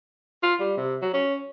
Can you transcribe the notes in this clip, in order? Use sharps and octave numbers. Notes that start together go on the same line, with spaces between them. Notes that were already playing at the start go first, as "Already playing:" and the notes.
F4
G3
C3
F#3
C#4